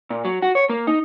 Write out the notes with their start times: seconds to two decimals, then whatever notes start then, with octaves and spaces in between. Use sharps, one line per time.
0.10 A#2
0.25 F#3
0.42 F#4
0.55 C#5
0.70 A#3
0.87 D#4